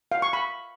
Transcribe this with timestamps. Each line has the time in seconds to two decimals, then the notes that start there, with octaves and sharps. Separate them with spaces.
0.12 F5
0.22 C#6
0.33 B5